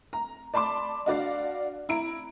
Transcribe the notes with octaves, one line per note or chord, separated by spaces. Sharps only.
A#5
D5 A5 B5 C6 D6
D4 F#4 D5 F5
E4 A#5 D7